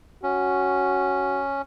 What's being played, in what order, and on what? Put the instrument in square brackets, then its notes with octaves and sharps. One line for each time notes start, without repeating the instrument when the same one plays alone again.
[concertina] C#4 [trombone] F#4